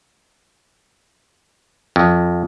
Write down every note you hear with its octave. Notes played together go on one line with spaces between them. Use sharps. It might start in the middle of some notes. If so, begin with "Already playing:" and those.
F2